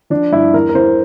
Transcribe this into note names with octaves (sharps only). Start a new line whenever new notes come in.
F3 D4
G2 E4
E2 A#4
A#4
E2 C5